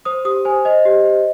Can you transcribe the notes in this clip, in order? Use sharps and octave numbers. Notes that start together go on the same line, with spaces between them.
C5 D#6
G4 D#6
C5 G#5
C5 D#5
G4
C5